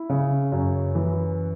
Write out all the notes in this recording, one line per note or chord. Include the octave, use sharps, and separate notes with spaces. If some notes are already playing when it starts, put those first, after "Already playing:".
Already playing: E4
C#3
F#2
E3